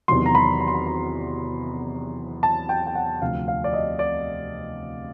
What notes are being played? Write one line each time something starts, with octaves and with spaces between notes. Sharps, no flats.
E2 C3 D#3 F#3 C6
A#5
B5
B5
C6
B5
A#5
A5
G5
G5
F#5
D2 C3 F3 F5
F5
D5
D#5
D5